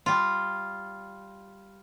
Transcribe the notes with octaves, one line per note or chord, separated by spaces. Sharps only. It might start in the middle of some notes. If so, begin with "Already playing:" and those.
G3 F4